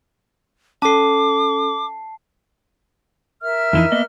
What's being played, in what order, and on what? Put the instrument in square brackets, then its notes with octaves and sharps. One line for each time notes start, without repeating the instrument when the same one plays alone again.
[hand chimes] C#4 A4 [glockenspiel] A5 C7 [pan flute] D6
[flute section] A#4 E5 F6
[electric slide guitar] F2 E3 D#4
A#3 B3 D#5